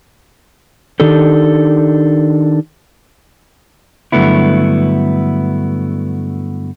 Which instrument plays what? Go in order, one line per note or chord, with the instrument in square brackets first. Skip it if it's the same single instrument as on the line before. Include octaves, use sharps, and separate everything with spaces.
[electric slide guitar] D#3 D4 D#4 G4 A4
[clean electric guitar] G2 D3 F#3 A3 B3 E4